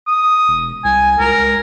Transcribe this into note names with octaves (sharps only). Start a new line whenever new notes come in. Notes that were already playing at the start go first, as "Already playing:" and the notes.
D#6
E1
C2 G#5
C#2 A#4